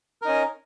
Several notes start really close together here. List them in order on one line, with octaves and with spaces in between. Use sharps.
A#4 D#4 C#4